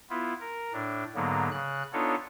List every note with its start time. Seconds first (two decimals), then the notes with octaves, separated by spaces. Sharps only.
0.10 B3 E4 F4
0.40 A#4
0.73 A2 D4
1.15 G#2 D3 F#3 A#3 B3
1.51 C#3 F#6
1.93 B3 D4 D#4 F4 A4 C#5